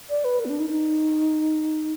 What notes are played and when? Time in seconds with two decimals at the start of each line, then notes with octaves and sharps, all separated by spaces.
0.10 D5
0.25 B4
0.40 A#4
0.45 B3
0.49 D4
0.60 D#4
0.70 D#4